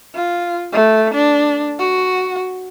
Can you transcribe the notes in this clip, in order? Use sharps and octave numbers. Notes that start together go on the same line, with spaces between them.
F4
A3
D4
F#4